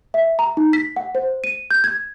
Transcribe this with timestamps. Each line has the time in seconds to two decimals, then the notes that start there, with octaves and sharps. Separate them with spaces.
0.14 E5
0.39 A#5
0.57 D#4
0.73 B6
0.96 F#5
1.15 C5
1.44 D#7
1.71 G6
1.84 G#6